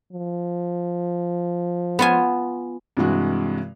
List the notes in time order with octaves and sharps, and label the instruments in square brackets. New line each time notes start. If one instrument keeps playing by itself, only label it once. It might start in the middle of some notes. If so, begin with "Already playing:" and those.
[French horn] F3
[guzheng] B3 F4 G#5
[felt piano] G2 C3 E3 G#3 F#4